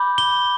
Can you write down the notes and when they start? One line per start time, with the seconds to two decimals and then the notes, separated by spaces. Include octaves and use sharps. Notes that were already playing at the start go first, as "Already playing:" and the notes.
Already playing: B5 D6 G6
0.18 G7